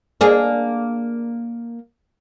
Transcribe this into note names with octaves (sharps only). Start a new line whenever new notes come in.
A#3 D4 G#4